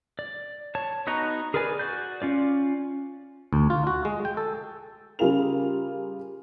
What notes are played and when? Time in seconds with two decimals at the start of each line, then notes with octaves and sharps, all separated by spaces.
0.19 D5
0.75 C#5 A5
1.07 B3 D#4 F#4 D#5 A#5
1.54 G#4 A#4 B4 D5 G#5
1.79 F#4 D5 G6
2.22 C#4 F4 D5
3.53 D2
3.70 F4
3.87 F#4
4.05 G#3
4.25 G5
4.37 A4
5.19 C#3 G3 F4 G#4 A#4 F7